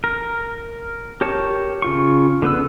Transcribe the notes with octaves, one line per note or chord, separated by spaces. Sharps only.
A#4
G4 A#4 C#5 A5
C#3 F4 C#6
D3 B3 B4 E6